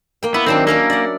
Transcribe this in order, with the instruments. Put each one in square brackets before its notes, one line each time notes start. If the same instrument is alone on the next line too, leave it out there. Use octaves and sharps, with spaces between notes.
[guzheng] A#3 G5
[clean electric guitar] B3 [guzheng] E4
[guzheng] D#3 F#3 D4 [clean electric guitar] C4
[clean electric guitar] A#3 [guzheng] C#4 A#4 E5
[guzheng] D5 F#5